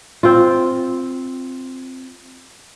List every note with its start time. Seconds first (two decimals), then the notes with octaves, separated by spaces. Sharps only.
0.23 C4 F4